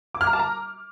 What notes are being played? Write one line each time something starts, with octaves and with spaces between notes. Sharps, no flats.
D6
F6
A#5
A5
A#5